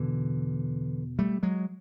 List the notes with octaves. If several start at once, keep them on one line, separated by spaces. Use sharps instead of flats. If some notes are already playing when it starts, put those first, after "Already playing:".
Already playing: E2 B2 D3 E3
G3 A3
F#3 G#3